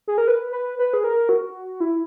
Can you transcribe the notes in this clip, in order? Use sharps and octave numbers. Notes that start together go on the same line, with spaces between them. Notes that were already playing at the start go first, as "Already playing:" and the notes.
G#4
A#4
B4
B4
B4
G#4
A#4
F#4
E4